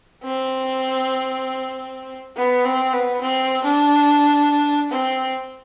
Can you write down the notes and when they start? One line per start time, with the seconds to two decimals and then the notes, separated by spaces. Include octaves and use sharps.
0.23 C4
2.37 B3
2.65 C4
2.93 B3
3.21 C4
3.64 D4
4.91 C4